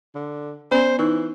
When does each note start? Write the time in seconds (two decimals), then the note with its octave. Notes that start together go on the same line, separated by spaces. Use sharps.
0.15 D3
0.72 B3 C#4 C5 D5
0.99 E3 D#4